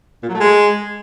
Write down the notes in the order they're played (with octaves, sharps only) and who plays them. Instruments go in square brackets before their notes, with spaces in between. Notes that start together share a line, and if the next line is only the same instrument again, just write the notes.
[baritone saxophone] A#2
F#3
A3
G#3